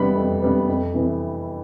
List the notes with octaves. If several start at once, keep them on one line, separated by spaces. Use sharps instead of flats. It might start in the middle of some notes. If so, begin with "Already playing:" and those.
Already playing: C3 G3 B3 B5
F2
C3 G3 B3
F2
C3 E3